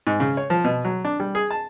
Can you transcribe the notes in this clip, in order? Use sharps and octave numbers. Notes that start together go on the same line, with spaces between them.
G#2
C#3
C#5
F3
B2
F#3
D4
G3
G#4
A5